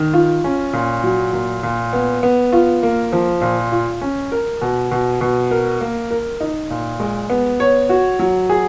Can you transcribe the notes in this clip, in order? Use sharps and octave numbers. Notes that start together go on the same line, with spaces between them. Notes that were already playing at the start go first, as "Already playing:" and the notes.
Already playing: D#3
F4
C#4
A#2
F#3
A#2
A#2
B3
B3
F4
A#3
F3
A#2
F4
C#4
A#4
B2
B2
B2
A#4
A#3
A#4
D#4
A#2
G#3
B3
C#5
F#4
F#3
G#4